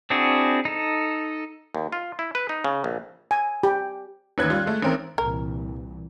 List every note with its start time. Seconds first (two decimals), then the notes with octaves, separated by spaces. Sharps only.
0.10 C4 D4 E4 F#4 G#4
0.65 D#4 A4
1.75 D#2
1.92 F4
2.19 E4
2.35 B4
2.49 D#4
2.64 C#3
2.84 A#1
3.31 G#5
3.63 G4
4.38 A1 D#2 B4 F#6 G#6
4.50 G3 F4
4.66 G#3 A3
4.82 A1 D#3 C4 A#4
5.18 C2 A#2 E3 A#4